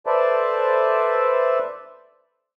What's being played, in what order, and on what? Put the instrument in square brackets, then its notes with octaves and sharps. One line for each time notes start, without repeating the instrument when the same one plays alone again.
[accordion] A4 B4 C5 D5 E5 A5